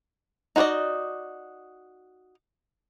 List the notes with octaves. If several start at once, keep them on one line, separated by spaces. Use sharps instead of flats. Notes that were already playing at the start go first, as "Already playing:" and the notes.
D#4 F#4 C5 D5 D#5